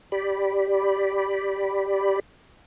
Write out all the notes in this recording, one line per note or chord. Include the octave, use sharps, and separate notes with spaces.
G4 D5 B5